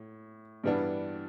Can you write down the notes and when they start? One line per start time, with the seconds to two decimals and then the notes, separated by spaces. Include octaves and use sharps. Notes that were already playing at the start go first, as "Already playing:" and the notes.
Already playing: A2
0.64 G2 E3 G3 B3 D4